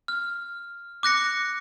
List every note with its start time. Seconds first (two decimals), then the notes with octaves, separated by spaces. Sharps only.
0.08 F6
1.03 D6 F#6 A#6 C#7